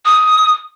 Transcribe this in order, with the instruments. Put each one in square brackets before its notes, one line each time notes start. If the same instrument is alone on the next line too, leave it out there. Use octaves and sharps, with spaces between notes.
[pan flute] D#6